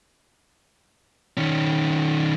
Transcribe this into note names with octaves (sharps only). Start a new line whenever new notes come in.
D#3 C#4